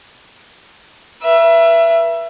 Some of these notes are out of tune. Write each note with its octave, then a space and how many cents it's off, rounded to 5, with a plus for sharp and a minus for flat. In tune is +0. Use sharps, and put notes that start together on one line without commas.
B4 -40 E5 +20